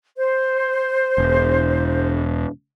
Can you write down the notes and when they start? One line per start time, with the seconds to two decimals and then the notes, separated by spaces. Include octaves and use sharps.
0.17 C5
1.18 E1